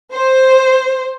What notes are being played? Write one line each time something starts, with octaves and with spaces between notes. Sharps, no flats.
C5